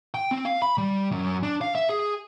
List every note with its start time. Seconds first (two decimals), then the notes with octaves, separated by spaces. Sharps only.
0.14 G5
0.31 C4
0.45 F5
0.62 B5
0.78 G3
1.11 F#2
1.43 D4
1.61 F5
1.75 E5
1.89 G#4